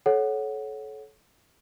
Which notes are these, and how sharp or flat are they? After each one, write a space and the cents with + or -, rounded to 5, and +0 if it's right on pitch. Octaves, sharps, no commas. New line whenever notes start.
A4 -30 C#5 -5 F#5 +0